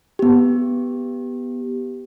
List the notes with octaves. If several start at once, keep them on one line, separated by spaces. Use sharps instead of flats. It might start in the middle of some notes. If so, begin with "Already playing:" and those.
B3 G4